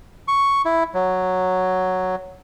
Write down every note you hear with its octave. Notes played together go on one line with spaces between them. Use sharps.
C#6
E4
F#3